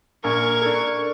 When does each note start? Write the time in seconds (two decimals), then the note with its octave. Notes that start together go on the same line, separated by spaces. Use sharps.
0.24 A#1 A#4 G#5 C#6 G#6
0.62 D4 A4